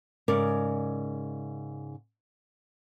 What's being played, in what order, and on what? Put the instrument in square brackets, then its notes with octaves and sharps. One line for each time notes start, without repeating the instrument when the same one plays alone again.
[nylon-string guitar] G#2 C#3 G#4 A#4 D5